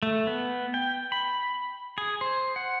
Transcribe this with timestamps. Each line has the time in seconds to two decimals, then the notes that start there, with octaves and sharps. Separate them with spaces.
0.03 A3
0.27 B3
0.74 G5
1.12 B5
1.98 G#4
2.21 C5
2.56 F#5